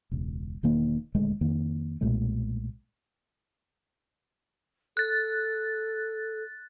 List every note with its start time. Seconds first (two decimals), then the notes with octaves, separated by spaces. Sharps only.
0.11 E1 C#2
0.63 E1 D#3 A#3
1.15 D#1 D2 G#3 A3
1.41 F2 D#3 A#3
2.01 B1 A#2 G#3 A3
4.97 A4 F#6 A6